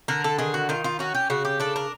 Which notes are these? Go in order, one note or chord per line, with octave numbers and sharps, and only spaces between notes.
D3 A#4
A4
D#3 G#4
F#4
D#3 F4
F4
C#4 F#4
G4
C#3 F#4
G4
D4 A4
A#4